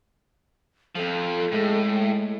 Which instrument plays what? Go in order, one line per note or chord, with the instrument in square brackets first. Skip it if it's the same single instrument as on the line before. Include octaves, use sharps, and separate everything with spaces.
[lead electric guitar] F2 F3 [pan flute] A4
[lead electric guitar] A2 [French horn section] G#3